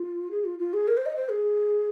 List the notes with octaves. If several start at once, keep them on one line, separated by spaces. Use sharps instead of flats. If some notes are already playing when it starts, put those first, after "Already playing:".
Already playing: F4
G#4
F4
F4
G#4
A#4
C5
D#5
C5
G#4